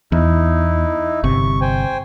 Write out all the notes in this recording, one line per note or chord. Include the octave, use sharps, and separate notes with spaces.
E2 D#4 E4
G1 C3 C#6
C5 G5 G#5